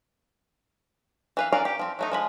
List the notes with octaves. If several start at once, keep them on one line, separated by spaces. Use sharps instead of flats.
E3 B4 F5
E3 C#4 A#4 D5 F5
G4
F3 C4
F#3 A3 D#4
F3 G#3 B5